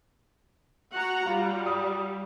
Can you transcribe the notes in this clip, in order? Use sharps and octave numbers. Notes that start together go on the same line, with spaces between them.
F#4 F#5 A#5
G3 F4
D#6